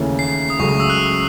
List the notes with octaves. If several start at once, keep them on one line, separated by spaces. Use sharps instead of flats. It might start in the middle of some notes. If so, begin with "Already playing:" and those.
Already playing: D#2 C#3 E3 A3 C#4
C7
D#6
C#2 C#3 F#3 A3 C#6
D#6
E6
F#6